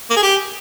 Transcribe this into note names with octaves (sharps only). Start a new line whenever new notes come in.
A#3
G#4
G4